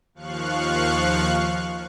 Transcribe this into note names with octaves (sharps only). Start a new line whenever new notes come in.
D#2 F3 F5 C#6 F#6